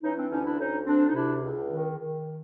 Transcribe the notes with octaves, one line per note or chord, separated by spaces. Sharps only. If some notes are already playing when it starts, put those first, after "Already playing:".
E3 C#4 D#4
C4 D4
D2 C#4 D#4
D4 E4
D2 C#4 D#4
D2 C4 D4
D#4
C3 D4 E4
C#2
D#3
D#3